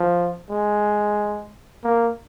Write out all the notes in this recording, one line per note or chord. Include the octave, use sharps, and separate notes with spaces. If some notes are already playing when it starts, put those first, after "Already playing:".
Already playing: F3
G#3
A#3